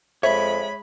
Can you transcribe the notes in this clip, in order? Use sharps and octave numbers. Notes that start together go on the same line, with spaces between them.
F2 G#3 C#5 E5 B5